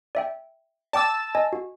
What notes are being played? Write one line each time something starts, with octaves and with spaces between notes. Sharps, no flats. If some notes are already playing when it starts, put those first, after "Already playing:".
D5 E5 G5
D5 G5 A5 D6 E6
D#5 G#5
F#4